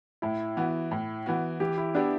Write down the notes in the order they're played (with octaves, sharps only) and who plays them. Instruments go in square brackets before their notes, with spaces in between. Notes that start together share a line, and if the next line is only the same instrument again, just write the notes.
[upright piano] A2 [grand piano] E4
[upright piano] E3 B3 F#4
A2
E3 B3 F#4
[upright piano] E3 [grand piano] G4
[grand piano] E4
[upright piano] B3 E4 G4 [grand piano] D4